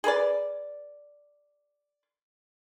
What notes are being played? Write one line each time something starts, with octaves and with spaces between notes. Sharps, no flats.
G#4 A#4 B4 D5